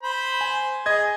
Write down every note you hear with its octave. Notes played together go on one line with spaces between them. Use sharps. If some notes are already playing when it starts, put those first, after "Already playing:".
C5 B5
G#5
G#4 D#5 G#6